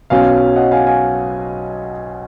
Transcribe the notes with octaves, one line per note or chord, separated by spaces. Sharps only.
B1 B2 F#3 C#4 F5 G#5
D#5 F#5
F5 G#5
F5 G#5